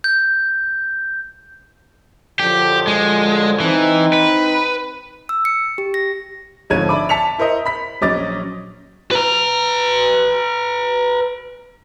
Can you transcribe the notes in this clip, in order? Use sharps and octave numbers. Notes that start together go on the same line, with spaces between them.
G6
F#2 D3 F3 G4
G#3
E3 C4 D#4
B4
E6
C#7
G4
A#6
G#1 D3 F3 C#5 G#6 D#7
D5 E5 B5 D6
A5 B6 C#7 F7
E4 A#4 C5 D#5
B5 B6
A#1 F#3 C#4 D#5 D6 A6
B4 A#5